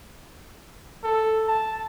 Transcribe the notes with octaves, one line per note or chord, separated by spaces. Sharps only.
A4
A5